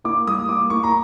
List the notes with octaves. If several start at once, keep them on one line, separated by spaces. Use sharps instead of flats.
A#3 D6
G3 D#6
A#3 D6
A#3 C#6
A#5